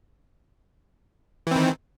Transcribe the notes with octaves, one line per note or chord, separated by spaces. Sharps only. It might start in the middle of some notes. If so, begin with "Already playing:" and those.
D#3 E3 C4